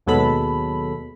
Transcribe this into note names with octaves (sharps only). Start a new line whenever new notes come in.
D#2 B2 F#3 G#3 A4 B5